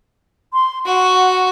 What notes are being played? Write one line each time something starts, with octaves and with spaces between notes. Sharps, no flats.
C6
F#4 F#5